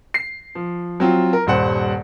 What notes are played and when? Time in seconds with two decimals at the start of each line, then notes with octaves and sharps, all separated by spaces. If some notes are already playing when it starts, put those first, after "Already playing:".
0.14 C7
0.55 F3
1.00 F#3 C4 F4
1.33 A#4
1.47 D#1 G2 C5 F#5